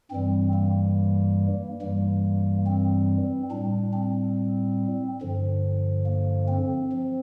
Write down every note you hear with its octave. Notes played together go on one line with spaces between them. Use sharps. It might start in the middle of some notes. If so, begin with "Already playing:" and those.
G2 E3 G3 C4
A#3
G2 E3 G3 A#3
C4
A2 G3 D4
C4
G2 D3 F3
A#3
C4
F3